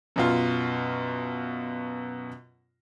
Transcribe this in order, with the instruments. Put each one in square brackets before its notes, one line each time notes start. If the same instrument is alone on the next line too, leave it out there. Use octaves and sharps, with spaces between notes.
[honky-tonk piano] F#2 B2 F4